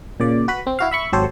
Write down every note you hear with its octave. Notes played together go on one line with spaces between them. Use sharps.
A#2 C#3 D5
F#4 B4 B5
C4
E4 F#4 F5
E5 B5 C#6
G#1 F#3 G4 A4 C5 C#5